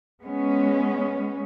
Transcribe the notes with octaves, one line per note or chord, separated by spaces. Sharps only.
G#3 B3 C#4